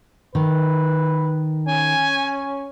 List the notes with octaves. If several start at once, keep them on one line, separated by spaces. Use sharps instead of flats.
D#3 B4
C#4 G#5